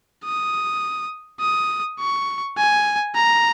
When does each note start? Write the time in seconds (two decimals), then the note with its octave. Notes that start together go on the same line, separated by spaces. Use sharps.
0.25 D#6
1.41 D#6
2.00 C#6
2.57 G#5
3.15 A#5